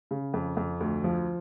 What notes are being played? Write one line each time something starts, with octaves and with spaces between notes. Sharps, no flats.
C#3
F2
F2
D2
F3